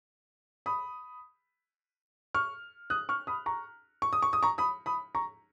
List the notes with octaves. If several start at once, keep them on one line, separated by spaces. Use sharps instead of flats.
B5 D#6
C#6 F6
D#6 F#6
C#6 F6
B5 D#6
A#5 C#6
C#6
D#6
C#6
D#6
A#5 C#6
B5 D#6
B5 D#6
A#5 C#6